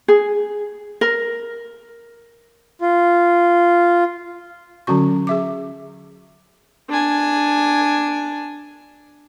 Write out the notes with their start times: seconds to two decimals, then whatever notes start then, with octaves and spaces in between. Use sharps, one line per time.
0.08 G#4
1.01 A#4
2.80 F4
4.87 D3 F#3 C#4 F#4 C#6
5.27 G#4 E5 D6
6.89 D4 G#5